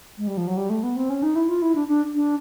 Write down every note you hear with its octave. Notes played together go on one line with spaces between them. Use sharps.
G#3
G3
F3
F#3
G3
A3
B3
C4
C#4
D#4
E4
F4
E4
D4
D4
D4